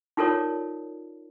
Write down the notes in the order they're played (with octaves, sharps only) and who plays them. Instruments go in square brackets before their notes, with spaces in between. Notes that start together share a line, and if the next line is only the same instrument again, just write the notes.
[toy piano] D#4 F4 A4 A#4 C#5 D5